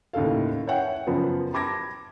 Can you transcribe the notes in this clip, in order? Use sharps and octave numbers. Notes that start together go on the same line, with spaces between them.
D#2 A2 C#3 A4 F5
C#5 E5 F#5 G5
F#2 C#3 F3 B3
A5 B5 D6 G#6 A#6